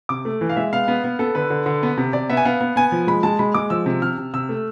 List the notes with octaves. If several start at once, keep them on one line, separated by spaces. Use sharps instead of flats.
C3 D6
A3
E3
F5
G#3 E5
B3 F5
B3
B3
B3 A4
D3 B4
D3
D3
B3
C3
C3 D5
B3 E5
G#5
B3 F5
B3
B3 G#5
F3
G#3 B5
G#3 A5
G#3 B5
G#3 D6
F3 E6
C3
C3 F6
C3
C3 E6
A3